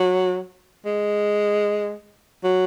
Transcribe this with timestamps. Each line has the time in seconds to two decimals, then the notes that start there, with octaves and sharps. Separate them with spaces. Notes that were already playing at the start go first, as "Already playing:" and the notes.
Already playing: F#3
0.86 G#3
2.44 F#3